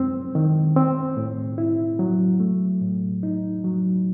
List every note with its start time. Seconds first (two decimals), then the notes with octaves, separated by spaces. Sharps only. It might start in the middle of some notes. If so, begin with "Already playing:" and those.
Already playing: F#2 G#3 C4
0.35 D#3
0.76 C4
1.17 A2
1.58 E4
1.99 F#3
2.40 A3
2.81 A2
3.23 D#4
3.64 F#3